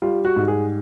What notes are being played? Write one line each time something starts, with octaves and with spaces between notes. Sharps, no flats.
G3 F4
F#4
G#2
G#4